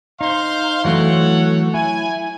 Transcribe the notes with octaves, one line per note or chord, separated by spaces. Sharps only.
D#4 C5 F5 C6
E3 F#3 A3 A4 C#5 F#5
E4 G#5